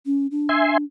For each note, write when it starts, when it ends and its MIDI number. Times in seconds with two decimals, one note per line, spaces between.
0.06 0.27 61
0.31 0.84 62
0.49 0.78 76
0.49 0.78 80
0.49 0.78 84